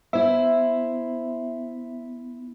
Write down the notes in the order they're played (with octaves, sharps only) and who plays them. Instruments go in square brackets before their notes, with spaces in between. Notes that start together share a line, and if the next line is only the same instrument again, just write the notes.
[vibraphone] B3 [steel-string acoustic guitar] E4 C5 [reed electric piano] E5